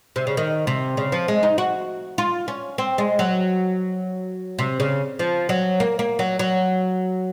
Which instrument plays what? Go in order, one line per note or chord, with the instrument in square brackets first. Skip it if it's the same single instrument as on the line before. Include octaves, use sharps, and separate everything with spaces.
[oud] C3
C#3
D#3
C3
C#3
F3
G#3
D#4
F#4
F4
C#4
C4
G#3
F#3
C3
C#3
F3
F#3
A#3
A#3
F#3
F#3